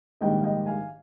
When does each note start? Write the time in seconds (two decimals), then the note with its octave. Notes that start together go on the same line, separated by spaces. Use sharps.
0.21 A#1 G#2 D#3 G3 D#5 G5
0.40 F5
0.44 D#5 G5
0.66 F5 G#5